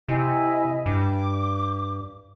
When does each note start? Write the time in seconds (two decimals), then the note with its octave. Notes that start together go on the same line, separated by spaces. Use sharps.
0.08 C3 E4 D#5 G#5
0.86 G2 D6